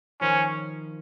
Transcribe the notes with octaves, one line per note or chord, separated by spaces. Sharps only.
D#3 F3 C#4